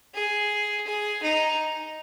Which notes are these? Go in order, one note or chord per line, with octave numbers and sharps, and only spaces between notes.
G#4
G#4
D#4